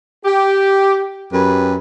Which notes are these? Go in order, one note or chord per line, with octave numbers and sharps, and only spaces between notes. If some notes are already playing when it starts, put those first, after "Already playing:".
G4
F#2 G4 B4 B5